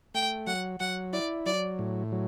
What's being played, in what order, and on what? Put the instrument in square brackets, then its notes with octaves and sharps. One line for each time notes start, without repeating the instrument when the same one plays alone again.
[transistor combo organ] A3 [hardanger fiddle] G5
[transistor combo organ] F#3 [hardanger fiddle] F#5
[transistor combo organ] F#3 [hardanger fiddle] F#5
[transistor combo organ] E4 [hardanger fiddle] D5
[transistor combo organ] F#3 [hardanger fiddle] D5
[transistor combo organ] A2
F#3